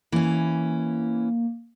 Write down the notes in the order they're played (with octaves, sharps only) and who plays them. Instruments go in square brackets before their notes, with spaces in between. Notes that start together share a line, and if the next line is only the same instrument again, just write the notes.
[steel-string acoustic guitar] E3 C#4 [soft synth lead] A#3